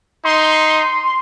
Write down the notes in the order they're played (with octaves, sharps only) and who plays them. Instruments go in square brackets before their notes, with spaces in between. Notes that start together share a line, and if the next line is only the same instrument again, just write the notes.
[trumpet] D#4 [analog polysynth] C6
[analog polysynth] C6
C6